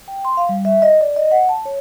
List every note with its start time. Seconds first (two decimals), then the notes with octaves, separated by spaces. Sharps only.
0.08 G5
0.25 C6
0.37 F5
0.49 G3
0.65 E5
0.82 D#5
1.01 D5
1.16 D#5
1.31 F#5
1.49 A5
1.65 C#5